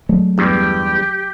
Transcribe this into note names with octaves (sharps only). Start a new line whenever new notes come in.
F#3 G#3 A3
E2 G2 G4